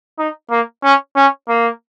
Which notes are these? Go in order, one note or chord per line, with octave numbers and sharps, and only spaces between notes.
D#4
A#3
C#4
C#4
A#3